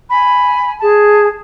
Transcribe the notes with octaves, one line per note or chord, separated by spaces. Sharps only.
G#5 B5
G#4 A5